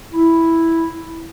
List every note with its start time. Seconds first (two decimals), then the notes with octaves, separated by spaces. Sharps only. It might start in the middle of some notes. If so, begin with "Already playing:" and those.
0.13 E4